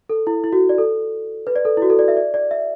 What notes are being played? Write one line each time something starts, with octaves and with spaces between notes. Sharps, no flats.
A4
E4
E4
F#4
D5
A4
B4
D5
A4
E4
F#4
A4
D5
E5
D5
D5
E5